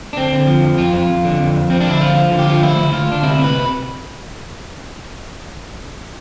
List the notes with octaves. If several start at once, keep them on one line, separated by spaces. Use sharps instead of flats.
D4
D3 C4
D3
F3
F2
F2 F4
F2
F2
D3
F2
F2
F3 C4
D4
D3 E4
F3 F4
F3
D3
G4
F3 F4
D2 E4
D2
D2 F4
D2 D4
C3 E4
C3
B4